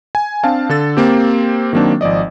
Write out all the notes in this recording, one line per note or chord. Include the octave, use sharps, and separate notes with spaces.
G#5
C4 D4 F5 A5
D3 A4 A6
A#3 C4 G4
D#3 F#3 A#3 C4 D4
G#1 F3 D5 D#5